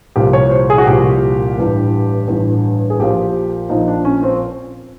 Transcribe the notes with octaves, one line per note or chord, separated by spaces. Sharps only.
C2 A#2 F3 G4
C#5
C5
G#4
F#4
C2 A#2 F3 G4
A1 G2 E3
A1 G2 E3
G#4
A#1 A#2 F3 G4
A#1 A#2 F3 D#4
D4
C#4
C4